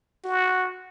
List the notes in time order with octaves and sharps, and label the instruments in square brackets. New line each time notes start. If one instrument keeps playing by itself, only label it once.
[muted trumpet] F#4